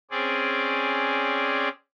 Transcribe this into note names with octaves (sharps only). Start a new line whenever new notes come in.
C4 C#4 G#4 D5